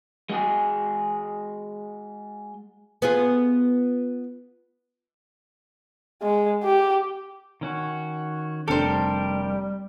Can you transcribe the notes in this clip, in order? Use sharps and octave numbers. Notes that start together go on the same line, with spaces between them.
G#3 F#4 G#4
B3 F4 G#4
G#3
G4
D#3 C#4 F#4
F1 G3 D4 G4 A4 A#4 C5